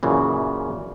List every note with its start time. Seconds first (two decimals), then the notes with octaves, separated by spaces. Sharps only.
0.03 F#2 A#2 C#3 E3